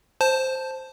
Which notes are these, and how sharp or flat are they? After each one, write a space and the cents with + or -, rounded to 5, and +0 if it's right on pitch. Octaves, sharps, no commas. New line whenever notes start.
C5 +0 A5 +0